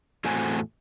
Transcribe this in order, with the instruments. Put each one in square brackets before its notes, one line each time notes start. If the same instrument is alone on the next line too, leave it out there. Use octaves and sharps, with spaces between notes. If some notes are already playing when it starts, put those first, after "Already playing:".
[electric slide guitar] E2 A2 A3 C4 F#4 G#5